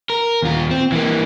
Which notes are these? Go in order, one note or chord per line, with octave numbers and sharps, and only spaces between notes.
A#4
D#2 F4
C4
E3 A#3